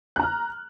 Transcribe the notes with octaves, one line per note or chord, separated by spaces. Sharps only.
A#5 F6 F#6